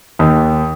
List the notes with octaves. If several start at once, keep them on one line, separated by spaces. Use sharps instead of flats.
D#2